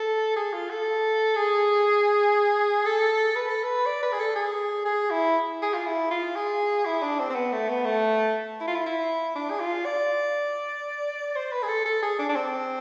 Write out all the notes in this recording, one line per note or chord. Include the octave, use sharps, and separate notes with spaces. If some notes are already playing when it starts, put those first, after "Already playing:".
Already playing: A4
G#4
F4
A4
G#4
A4
B4
A4
B4
D5
B4
G#4
A4
G#4
G#4
E4
G#4
F4
E4
F4
G#4
E4
D4
C4
C4
B3
A3
B3
A3
E4
F4
E4
E4
D4
G#4
F4
D5
C5
B4
G#4
A4
A4
G#4
D4
D4
C4